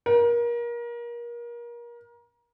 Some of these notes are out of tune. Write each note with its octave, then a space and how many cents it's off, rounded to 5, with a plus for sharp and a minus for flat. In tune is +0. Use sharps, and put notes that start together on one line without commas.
A#4 +30